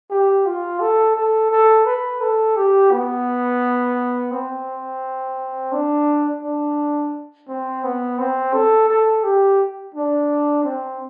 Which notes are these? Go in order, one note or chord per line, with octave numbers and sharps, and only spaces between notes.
G4
F4
A4
A4
A4
B4
A4
G4
B3
C4
D4
D4
C4
B3
C4
A4
A4
G4
D4
C4